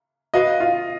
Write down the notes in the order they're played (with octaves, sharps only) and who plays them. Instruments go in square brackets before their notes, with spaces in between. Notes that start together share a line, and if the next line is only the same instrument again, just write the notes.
[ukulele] F#4 B4 F5 [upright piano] D#5
[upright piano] F4